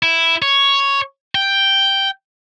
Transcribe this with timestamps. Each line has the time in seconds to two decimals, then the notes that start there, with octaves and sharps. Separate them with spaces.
0.03 E4
0.42 C#5
1.35 G5